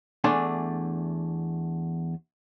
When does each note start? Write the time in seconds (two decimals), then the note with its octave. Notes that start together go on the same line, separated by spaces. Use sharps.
0.24 E2 A3 D4 G#5 C6